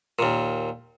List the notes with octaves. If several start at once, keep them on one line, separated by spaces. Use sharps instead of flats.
D#2 A#2